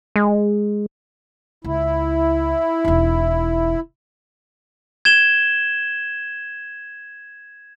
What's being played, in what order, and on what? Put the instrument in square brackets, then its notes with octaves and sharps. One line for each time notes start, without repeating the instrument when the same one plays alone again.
[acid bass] G#3
[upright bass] C#2 [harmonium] E4
[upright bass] E1 D#4
[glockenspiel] G#6 E7 G7